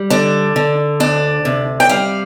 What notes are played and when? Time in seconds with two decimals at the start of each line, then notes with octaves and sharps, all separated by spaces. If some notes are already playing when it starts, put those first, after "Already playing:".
Already playing: G3
0.10 D3 D4
0.56 D3
1.00 D2 D4
1.45 C3
1.80 G5
1.89 G3 F5